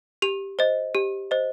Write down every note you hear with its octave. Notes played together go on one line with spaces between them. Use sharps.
G4 F7
C5 D#5
G4
C5 D#5